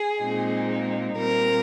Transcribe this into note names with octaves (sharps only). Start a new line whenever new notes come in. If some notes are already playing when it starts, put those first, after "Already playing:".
Already playing: G#4
A#2 G#3 C4 D#4
A#2 G3 C4 A#4